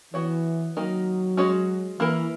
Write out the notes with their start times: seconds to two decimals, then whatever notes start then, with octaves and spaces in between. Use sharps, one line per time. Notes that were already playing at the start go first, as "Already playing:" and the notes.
0.14 E3 B3 F#4 C#5
0.76 D#3 F#3 A#3 D#4 A#4
1.37 G#3 C#4 F#4 C#5
1.99 E3 A#3 E4 A#4